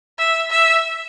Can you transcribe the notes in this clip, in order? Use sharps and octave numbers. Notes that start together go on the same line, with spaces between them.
E5
E5